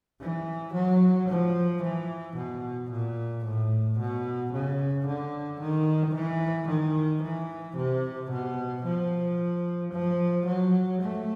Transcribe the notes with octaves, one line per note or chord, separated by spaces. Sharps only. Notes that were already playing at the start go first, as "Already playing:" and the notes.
E3
F#3
F3
E3
B2
A#2
A2
B2
C#3
D3
D#3
E3
D#3
E3
C3
B2
F3
F3
F#3
A3